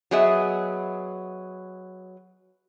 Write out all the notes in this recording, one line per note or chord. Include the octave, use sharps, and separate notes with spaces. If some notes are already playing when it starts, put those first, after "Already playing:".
F#3 B3 G#4 D#5 E5